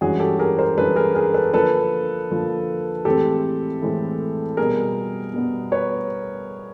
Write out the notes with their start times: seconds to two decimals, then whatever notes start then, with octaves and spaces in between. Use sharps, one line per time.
0.01 G2 E3 G#3 C#4 F#4 G#4
0.20 G4 A4
0.39 G#4 A#4
0.58 A#4 C5
0.78 G2 E3 G#3 C#4 A4 B4
0.96 G#4 A#4
1.15 G#4 A#4
1.34 A4 B4
1.54 D3 F3 A#3 A4 B4
2.30 D3 F3 A#3
3.05 A2 E3 G#3 C4 G4 A4
3.82 A2 E3 G#3 C4
4.57 B2 G3 B3 G#4 A#4
5.34 B2 G3 B3
5.72 B4 C#5